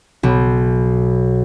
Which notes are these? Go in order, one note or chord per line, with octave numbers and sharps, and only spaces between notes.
B1